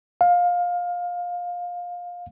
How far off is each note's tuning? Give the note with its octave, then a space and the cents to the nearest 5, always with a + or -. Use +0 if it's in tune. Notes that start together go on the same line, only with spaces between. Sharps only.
F5 +20